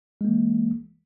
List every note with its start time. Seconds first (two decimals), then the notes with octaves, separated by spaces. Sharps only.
0.21 G#3
0.25 A#3
0.28 E3